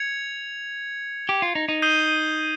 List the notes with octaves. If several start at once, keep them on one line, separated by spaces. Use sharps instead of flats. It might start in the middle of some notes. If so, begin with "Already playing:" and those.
Already playing: G#6 C#7 F7
G4
F4
D#4
D#4
D#6 G6 C7 D#7 G7